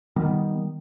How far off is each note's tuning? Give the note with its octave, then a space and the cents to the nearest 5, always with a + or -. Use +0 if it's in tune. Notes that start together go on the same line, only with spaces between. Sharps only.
D#3 +0 G3 +0 B3 +0